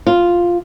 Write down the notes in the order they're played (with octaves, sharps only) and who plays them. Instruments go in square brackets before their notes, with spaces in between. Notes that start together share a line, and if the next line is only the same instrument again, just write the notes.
[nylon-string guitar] F4